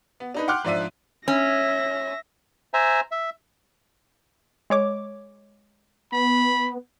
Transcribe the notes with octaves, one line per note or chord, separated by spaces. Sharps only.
B3
D4 D#4 B4
F#5 G5 C6 D6 F6 F#6
G#2 F3 D4 D5 E5 D#7
C#4 E5 A#6
C5 E5 G#5 A#5
E5
G#3 C#5 D6
B3 B5